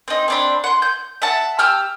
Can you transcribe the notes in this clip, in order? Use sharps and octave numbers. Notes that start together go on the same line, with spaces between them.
C4 D#4
C4 D4 B5
F#5 C6
G6
E5 F#5 A5
G4 E6 F6